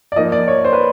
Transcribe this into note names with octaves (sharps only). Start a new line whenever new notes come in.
D5
F3 A#3 D#4 D#5
D5
C#5
C5
B4